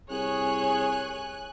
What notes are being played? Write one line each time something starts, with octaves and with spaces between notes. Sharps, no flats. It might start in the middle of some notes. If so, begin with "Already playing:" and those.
C2 G#4 C#5 G#5 F#6